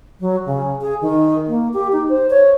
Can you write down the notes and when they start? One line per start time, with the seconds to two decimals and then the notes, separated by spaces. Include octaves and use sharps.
0.20 F#3
0.46 C#3
0.81 G#4
1.01 D#3
1.48 A#3
1.73 G4
1.92 D#4
2.09 C5
2.30 C#5